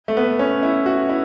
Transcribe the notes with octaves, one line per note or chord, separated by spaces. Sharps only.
A3
B3
C#4
E4
F#4
E4